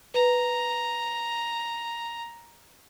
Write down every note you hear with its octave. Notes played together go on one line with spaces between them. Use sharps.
B4 A#5